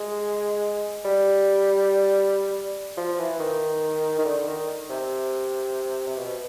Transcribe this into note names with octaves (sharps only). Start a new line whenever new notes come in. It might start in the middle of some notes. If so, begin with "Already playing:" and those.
Already playing: G#3
G3
F3
E3
D#3
D#3
D3
D#3
C3
C3
B2